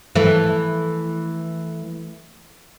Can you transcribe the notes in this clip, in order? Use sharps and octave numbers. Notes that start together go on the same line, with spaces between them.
E3 A3